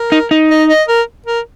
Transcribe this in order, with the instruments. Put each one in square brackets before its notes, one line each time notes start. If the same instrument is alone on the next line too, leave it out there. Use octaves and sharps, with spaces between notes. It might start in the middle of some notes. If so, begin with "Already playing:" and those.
Already playing: [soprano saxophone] A#4
[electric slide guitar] D#4
D#4
[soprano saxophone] D#5
D#5
A#4
A#4